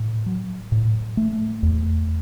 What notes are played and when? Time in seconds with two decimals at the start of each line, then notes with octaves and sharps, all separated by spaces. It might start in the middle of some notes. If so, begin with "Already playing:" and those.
Already playing: A2
0.26 F#3
0.72 A2
1.17 A3
1.63 E2